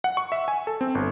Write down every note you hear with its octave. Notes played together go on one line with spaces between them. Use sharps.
F#5
C#6
E5
G#5
A4
C4
G1